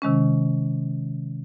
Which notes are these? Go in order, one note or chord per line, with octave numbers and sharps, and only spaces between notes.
C3 D#3 G#3 C#4